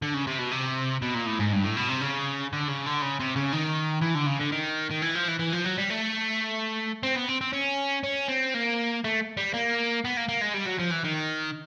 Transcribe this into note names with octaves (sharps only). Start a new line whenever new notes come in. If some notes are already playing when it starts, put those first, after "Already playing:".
D3
C#3
C3
B2
C3
B2
A#2
A2
G#2
G2
A2
B2
C3
C#3
D3
C#3
D3
C#3
C3
C#3
D#3
E3
D3
C#3
D3
D#3
D#3
E3
F3
E3
E3
F3
F#3
G3
A3
C4
B3
C4
C4
C#4
C#4
C4
A#3
A3
G3
A#3
B3
A#3
A#3
G#3
G3
F#3
F3
E3
D#3